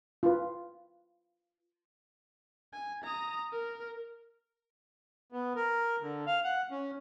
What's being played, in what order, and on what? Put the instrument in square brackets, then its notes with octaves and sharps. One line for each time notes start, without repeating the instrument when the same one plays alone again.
[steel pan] F4 B4
[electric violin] G#5
A#5 D#6
A#4
[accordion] B3
A#4
D3
F5
F#5
C#4